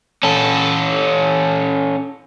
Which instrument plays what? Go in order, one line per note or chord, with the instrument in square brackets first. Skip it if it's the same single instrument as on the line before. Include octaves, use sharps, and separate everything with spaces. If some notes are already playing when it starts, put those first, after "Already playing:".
[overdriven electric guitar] C#4 A4